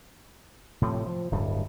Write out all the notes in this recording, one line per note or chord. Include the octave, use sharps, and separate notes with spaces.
A2 C3 F3
F3
D1 G2 G3